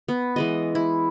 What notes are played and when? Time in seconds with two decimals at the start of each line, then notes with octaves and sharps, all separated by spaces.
0.08 B3
0.36 E3 G#3 D#5
0.75 E4